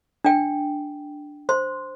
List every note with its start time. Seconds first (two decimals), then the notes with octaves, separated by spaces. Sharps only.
0.24 D4 G5
1.49 C5 C6